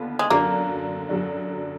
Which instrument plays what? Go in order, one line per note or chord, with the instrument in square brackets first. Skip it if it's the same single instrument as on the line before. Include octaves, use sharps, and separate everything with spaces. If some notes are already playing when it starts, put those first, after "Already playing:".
Already playing: [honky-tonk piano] D#2 D3 B3 F4
[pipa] G#3
[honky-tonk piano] F#2 D3 F#3 D4 [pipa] A#3
[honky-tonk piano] F#2 D3 F#3 D4